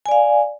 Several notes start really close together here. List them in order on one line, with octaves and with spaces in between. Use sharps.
G#5 D5 F5